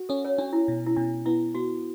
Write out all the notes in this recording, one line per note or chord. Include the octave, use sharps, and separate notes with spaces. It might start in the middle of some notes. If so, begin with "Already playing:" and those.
Already playing: F#4
C#4 A4
C#5
C#4 D4
E4
B2
E4
B2 D4
B3 E4
B3 F#4